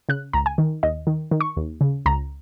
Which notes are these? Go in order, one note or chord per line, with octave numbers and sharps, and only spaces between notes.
C#3 F#6
C#2 A#5
G#5
D#3
D#2 D#5
D#3
D#3
C#6
D#2
C#3
C#2 A#5